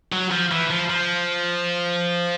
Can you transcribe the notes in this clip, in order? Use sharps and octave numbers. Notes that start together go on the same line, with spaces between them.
F#3
F3
E3
F3
F3